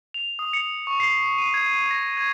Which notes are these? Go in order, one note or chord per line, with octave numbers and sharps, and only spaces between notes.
F7
D#6
C#7
C#6
C7
D#7
G#6
A#6
G#6